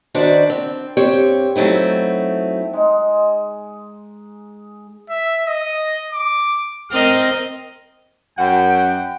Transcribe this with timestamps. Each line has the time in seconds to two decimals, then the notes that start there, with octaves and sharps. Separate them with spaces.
0.15 D#3 D4 F#4 B4 C5 D5
0.50 C4
0.97 G2 C4 G4 C5 C#5
1.56 F#3 A3 C4 D#4 E4
2.73 G#3 D#4 G#4
5.10 E5
5.46 D#5
6.12 D6
6.91 C4 A#4 D#5 F6
8.38 F#2 F#5 G5